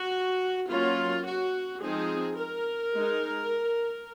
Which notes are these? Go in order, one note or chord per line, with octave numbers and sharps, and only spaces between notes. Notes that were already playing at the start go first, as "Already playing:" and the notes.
Already playing: F#4
F#3 A#3 C#4 F4
F#4
F3 G#3 C4 D#4 G#4
A#4
G#3 D#4